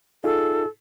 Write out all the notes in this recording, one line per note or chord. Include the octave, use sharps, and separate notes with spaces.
D#4 F4 G#4 A4